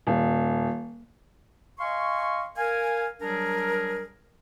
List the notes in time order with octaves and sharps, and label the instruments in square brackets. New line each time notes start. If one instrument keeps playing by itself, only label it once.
[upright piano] D#1
[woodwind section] D#5 F5 G#5 C6 C#6
A#4 F5 G#5
F#3 G3 D4 G#4 A#4